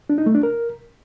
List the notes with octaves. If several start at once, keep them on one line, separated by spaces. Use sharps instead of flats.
D4
D#4
A3
D4
A#4